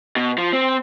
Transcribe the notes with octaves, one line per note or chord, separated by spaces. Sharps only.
B2
F3
C4